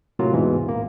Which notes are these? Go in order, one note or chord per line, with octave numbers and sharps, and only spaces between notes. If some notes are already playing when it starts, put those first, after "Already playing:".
A2 C3 F#3 A#3 F4
E2 G#2 B2 E3
A1 A#3